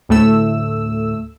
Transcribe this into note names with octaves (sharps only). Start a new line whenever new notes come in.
D2 A2 A3 E6